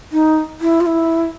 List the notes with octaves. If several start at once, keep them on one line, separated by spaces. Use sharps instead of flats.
D#4
E4
F4
E4